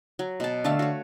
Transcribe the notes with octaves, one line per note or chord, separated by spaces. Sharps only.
F#3
B2 A5
D3 A3 F5 A5
F#4 C#5